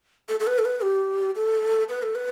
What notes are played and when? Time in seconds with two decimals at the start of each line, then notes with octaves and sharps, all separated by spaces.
0.29 A4
0.40 A4
0.47 B4
0.59 A4
0.65 B4
0.83 G4
1.36 A4
1.89 B4
2.03 A4
2.15 B4